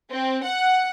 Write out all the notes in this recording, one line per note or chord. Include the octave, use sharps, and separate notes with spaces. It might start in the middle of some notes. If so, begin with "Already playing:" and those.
C4
F#5